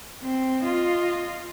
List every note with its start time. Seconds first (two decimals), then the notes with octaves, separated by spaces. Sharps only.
0.23 C4
0.64 F4 D#5